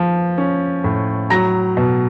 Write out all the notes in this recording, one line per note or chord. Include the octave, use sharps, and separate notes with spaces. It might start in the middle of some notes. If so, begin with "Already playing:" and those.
Already playing: F3
C#4
A2
F#3 A#5 A#6
B2